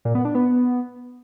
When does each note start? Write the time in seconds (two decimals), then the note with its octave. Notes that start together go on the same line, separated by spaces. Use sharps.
0.05 A#2
0.15 B3
0.25 D4
0.35 B3